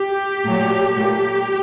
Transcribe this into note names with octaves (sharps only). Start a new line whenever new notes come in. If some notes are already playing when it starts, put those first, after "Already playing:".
Already playing: G4
A#2 F#3 A3
A#2 A3 G4